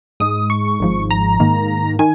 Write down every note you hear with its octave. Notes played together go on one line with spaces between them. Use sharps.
G#2 G#3 D#6
C#6
G#1 G#2 F3
A#5
G#2 D#3 A#3
D#3 G#5